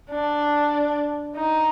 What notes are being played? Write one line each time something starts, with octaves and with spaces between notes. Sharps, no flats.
D4
D#4